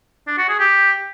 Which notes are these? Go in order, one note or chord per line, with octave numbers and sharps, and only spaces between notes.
D4
F#4
G#4
G4